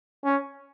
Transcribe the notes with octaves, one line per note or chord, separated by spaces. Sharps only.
C#4